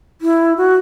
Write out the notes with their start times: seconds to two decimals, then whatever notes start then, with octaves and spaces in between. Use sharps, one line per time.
0.21 E4
0.57 F#4